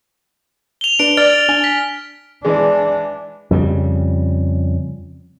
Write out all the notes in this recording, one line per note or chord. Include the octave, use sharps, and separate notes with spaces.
F7 G7
D4 B4 D7
D5 F6 A6
D4 G#5
B6
E3 G#3 D4
F2 C#3 G3